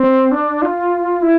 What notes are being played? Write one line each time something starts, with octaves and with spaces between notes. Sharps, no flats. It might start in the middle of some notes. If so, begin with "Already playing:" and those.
Already playing: C4
D4
F4
E4